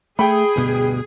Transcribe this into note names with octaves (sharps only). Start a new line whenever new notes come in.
A3 G#4 G5 B5
D2 G2 B2